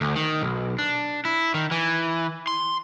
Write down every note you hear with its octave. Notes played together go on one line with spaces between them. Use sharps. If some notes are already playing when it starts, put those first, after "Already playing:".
D2
D#3
B1
D4
E4
D#3
E3
C6